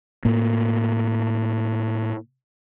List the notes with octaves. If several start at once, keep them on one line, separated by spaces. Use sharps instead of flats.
A2 A#3